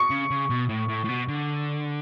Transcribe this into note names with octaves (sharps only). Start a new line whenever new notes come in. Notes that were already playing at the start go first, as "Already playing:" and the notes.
Already playing: C#6 C#7
C#3
C#3
B2
A2
A2
A2
B2
D3